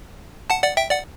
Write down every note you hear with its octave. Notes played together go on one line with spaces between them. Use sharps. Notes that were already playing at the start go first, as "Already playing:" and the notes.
F#5 A5
D5 F#5
E5 G5
D5 F#5